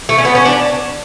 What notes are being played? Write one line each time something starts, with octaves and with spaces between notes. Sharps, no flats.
A3
C#4
B3
C#4
D4